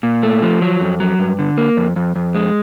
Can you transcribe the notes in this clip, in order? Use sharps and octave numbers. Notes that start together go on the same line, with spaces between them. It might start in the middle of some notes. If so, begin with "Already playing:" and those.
A#2
A3
F3
F#3
F2
F#3
G2
D3
A#3
F2
F2
F2
G#3